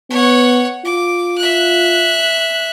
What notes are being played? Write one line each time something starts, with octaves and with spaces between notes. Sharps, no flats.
B3 C#5 F#5
F4 D6
E5 F#6